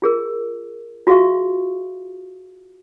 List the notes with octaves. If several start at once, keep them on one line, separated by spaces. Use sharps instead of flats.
F4 G#4 A#4
F4 F#4 G#4 E5 F5 C#6